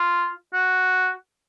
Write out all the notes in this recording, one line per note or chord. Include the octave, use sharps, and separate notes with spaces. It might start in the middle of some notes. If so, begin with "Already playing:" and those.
Already playing: F4
F#4